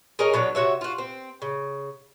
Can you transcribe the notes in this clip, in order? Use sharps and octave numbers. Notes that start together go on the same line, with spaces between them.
G#4 A#4 C#5 D#5
B2 F#3 D4 C#5
C3 F#4 C#5 E5
F4 F#4
C4
C#3